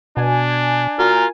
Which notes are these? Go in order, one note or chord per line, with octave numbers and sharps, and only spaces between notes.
B2 D4 G#5
F4 F#4 A#4